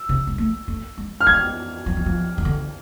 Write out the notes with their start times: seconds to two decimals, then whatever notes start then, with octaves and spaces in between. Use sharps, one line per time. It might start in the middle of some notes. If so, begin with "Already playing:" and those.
Already playing: E6
0.09 C3
0.27 G#3
0.38 A3
0.68 A3
0.98 G#3
1.21 F6
1.27 G#3 G#6
1.86 F3
1.97 E3
2.06 F3
2.38 E3
2.45 D3